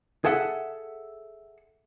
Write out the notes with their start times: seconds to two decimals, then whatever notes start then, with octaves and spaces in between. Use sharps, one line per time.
0.25 G#4 A4 E5 F#5